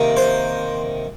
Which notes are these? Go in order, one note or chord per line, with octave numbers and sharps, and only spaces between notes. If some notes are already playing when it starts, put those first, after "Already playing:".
Already playing: C3 D#3 A#3
C5